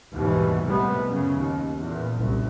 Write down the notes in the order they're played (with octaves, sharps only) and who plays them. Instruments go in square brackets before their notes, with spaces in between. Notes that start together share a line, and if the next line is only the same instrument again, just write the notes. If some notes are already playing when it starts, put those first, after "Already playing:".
[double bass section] D#2 G#2 B2 E3 G3
C2 A2 C3 G3 G#3 B3
F#2 C#3
D#2
E2 A#2
F#1 C2